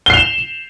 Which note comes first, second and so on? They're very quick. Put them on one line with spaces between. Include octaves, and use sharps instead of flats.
G7 C7 F7 E7